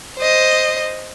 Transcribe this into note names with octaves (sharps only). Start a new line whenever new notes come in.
C5 D#5